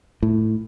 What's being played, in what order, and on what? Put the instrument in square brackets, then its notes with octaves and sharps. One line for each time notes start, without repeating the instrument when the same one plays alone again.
[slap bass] A2